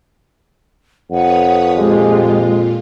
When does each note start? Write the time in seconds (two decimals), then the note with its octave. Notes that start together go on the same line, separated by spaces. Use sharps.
1.11 F2 B4 C#5 F#5 D#6
1.77 A#2 G#3 F4 G4